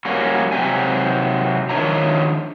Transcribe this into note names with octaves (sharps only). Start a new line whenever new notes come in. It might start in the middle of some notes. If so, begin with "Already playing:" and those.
G3 A#3 C#4 F#4
C3 F#3 G4 G#5
D#3 F3 D4 C#5 E5 A#5